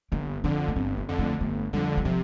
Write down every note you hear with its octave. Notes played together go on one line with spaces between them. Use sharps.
G1 A#3
F2 D3 D4
A#3
G1 C4
A#3
F2 D3
A3
G1 A3
F2 D3 G3
G3
C3 F3